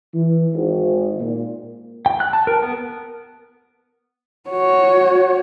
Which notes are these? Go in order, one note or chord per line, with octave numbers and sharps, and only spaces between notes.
E3
G#1
A#2
G5
F#6
A5
A#4
B3
F#4 C#5